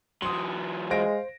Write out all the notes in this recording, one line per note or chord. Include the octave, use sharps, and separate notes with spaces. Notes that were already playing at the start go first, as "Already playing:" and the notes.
E3 F#3 C6 D#6
G#3 C5 F5 A#6 D7